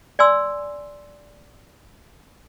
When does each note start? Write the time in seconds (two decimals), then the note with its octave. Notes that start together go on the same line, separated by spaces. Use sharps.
0.19 D5 G#5 C6 E6